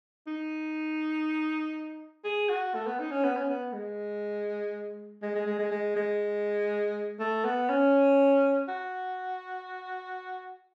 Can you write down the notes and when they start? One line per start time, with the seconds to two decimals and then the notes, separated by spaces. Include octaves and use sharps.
0.27 D#4
2.24 G#4
2.49 F#4
2.75 A3
2.86 B3
2.99 D#4
3.11 C#4
3.24 B3
3.36 C#4
3.49 B3
3.73 G#3
5.22 G#3
5.35 G#3
5.46 G#3
5.59 G#3
5.71 G#3
5.96 G#3
7.20 A3
7.45 B3
7.69 C#4
8.68 F#4